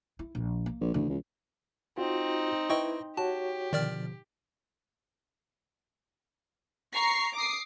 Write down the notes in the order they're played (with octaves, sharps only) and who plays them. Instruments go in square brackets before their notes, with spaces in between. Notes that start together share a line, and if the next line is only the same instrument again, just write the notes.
[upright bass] E4
A#1
A#3
[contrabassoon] A#1
[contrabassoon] D2 [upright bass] C#3 E3
[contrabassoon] C#2
[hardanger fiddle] C4 D#4 [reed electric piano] F4 F#4
[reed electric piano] E4 B4 [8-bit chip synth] D#5 G5 C#6
[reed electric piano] F#4 C#5 [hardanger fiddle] G4 [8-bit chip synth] A5
[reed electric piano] B2 D3 F3 [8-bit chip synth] D#3 D5 F6
[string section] A#5 C#6 C7
D6 D#6 C7